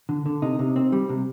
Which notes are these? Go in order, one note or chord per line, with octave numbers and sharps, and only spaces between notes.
D3
D3
C3 D#4
C3
C4
G3
C3